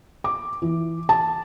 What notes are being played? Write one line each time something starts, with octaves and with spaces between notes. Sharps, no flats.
D6
E3
A5